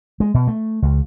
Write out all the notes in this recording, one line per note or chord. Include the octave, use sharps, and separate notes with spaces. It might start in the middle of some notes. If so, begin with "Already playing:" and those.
G#3
B2
A3
C#2